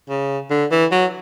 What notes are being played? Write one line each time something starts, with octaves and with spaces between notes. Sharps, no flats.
C#3
D3
E3
F#3